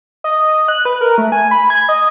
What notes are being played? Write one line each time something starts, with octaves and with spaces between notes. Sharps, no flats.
D#5
F#6
B4
A#4
A3
G#5
B5
G#6
D#5